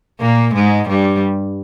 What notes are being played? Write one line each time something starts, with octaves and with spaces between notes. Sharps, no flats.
A#2 A#3
G#2 G#3
G2 G3